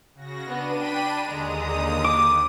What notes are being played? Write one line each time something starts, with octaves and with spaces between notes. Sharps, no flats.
C#3 F#4 A#6
B3 D4 D#7
G5 B5
D#2 D3 G#3 A#5 D#6
D6